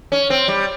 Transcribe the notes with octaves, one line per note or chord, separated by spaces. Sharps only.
C#4
C4
G3